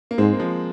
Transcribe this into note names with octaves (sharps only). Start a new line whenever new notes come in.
A#3
G#2 G#3 C4
A#3
F3 G#3